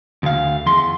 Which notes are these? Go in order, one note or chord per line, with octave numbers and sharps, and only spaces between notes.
D2 F5
E2 C6